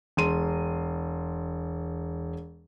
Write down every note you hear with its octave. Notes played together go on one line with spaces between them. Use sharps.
E1 C6 D#7